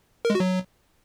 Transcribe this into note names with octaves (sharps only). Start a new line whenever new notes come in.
A#4
G#3
F#4
F#3